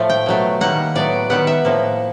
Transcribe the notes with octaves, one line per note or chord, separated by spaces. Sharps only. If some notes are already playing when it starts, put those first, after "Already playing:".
Already playing: A2 F3 A3
G5
B2 F#3 A3
D#3 G3 A#3 F#5
A2 F#3 B3 D5
D#3 G3 B3 F#5
E5
A2 F3 A#3